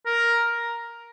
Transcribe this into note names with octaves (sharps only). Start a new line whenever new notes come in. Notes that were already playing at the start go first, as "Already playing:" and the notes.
A#4